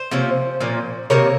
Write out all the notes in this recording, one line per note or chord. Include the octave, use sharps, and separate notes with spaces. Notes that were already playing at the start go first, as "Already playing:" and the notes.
Already playing: C5
C3 F3 A#3 C#4
A#2 F3 A#3 C#4
C3 D#3 A#3 A#4 C#5